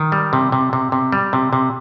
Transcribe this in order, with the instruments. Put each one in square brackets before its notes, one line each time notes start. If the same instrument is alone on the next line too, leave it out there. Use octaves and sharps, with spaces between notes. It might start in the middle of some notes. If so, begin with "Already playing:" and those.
Already playing: [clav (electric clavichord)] D#3
G3
C3
C3
C3
C3
G3
C3
C3